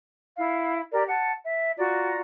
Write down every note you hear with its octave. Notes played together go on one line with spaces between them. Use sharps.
E4 F5
G4 A#4 D5
F#5 A5
E5
F4 F#4 D5 A#5